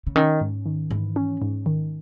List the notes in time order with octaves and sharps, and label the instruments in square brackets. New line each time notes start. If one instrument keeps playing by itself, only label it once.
[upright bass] C#3
[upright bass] D#3 [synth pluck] C#4
[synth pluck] G#2
D#3
[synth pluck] G#2 [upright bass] E3
[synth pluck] C#4
G#2
D#3